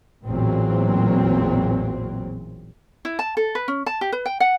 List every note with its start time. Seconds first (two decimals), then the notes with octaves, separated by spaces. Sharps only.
0.25 A1 E2 A#2 F#3 C4
3.05 E4
3.19 A5
3.37 A4
3.55 B4
3.68 C#4
3.86 A5
4.01 G4
4.12 B4
4.26 G5
4.40 F#5